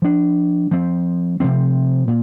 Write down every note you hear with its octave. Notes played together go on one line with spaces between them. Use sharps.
F3 D4
F3 C4
C3 F3 C4
A#2